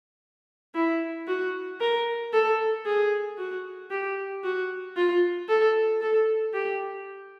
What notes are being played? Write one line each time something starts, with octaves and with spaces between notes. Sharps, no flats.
E4
F#4
A#4
A4
G#4
F#4
G4
F#4
F4
A4
A4
G4